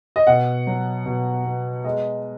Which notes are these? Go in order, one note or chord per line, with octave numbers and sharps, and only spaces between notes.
D#5
B2 F#5
F#3
B2
B3
G#3 D#5